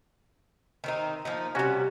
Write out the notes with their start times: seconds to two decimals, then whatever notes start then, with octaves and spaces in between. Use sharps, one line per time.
0.84 D#3 C4 D#4
1.25 F3 A#3 D#4
1.55 C3 G3 C#4 F#4